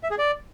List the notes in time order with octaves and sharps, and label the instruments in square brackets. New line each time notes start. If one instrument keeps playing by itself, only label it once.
[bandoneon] E5
G#4
D5